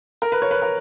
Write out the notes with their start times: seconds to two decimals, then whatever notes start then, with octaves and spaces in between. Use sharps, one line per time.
0.22 A#4
0.32 B4
0.42 C#5
0.51 B4
0.62 A#4